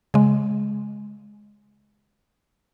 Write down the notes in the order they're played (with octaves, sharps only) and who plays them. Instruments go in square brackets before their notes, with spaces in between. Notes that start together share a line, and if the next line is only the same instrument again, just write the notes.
[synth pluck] C#3 G#3